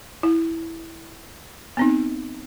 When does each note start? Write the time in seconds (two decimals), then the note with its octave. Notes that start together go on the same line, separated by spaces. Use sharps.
0.23 E4
1.77 B3 C4 D#4